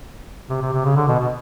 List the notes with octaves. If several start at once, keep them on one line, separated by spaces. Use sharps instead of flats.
C3
C3
C3
C#3
D3
B2
B2